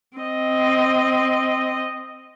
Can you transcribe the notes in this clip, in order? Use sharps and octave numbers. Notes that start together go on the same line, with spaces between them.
C4 D#5